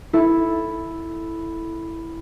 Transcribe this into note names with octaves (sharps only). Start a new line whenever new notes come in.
E4 A4